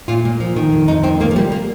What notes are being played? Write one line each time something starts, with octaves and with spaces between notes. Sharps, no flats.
A#2 F4
A#2
F3
D#3
F2
F2 D#4
D#3 C4
D#3 A#3
F3
F2 G3
A#3